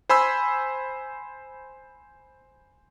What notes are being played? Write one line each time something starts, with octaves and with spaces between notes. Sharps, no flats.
C5 G#5 B5 C6 E6